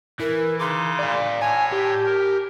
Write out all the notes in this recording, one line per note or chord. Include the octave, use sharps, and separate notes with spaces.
E3 A#4
C#3 D#4 C6 D6
D5 F5
A2 C#5 G#5 A5
G4
A#4